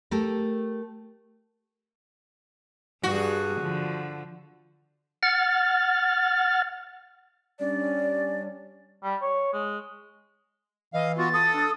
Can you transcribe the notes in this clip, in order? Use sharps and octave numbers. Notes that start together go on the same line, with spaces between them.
A3 G4 A4 A#4
G2 G3 F#4 G#4
D3 F3
F#5 F6 A6
G3 C#4 D4 D5
G3
C#5
G#3
E3 D#5 F5
B3 F4 F#4 A6
A4 D#6
D4